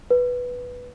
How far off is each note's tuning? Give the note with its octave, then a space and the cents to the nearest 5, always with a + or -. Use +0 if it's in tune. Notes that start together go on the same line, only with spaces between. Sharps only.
B4 +0